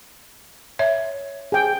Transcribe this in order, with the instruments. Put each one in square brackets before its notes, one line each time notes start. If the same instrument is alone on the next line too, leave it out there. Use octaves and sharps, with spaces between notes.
[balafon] C#5 E5
[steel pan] G#4 G5